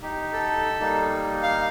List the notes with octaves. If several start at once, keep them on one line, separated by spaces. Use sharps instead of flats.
D#4 G4
A4
G3 A#3 D#4
F5